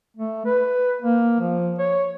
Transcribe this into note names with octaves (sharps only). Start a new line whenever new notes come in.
A3
B4
A#3
F3
C#5